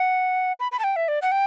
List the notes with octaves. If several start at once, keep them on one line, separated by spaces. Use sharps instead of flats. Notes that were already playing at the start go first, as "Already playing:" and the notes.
Already playing: F#5
B5
B5
A5
G5
E5
D5
F#5
G5